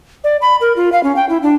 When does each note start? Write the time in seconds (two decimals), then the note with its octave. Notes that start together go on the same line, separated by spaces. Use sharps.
0.24 D5
0.41 B5
0.61 A#4
0.76 F4
0.92 F5
1.03 C#4
1.16 G5
1.29 E4
1.43 D4